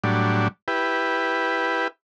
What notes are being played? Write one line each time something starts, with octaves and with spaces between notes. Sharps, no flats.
A2 F#3 G3 D4
E4 G4 B4